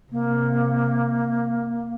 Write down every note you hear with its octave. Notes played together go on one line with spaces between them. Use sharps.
C3 A#3